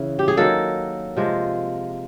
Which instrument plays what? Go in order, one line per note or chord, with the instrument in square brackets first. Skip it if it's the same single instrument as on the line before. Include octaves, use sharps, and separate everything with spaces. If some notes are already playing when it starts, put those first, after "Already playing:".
Already playing: [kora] C#3 E3
G4
G#4
D#3 F#3 A#3 A4
C3 F3 G#3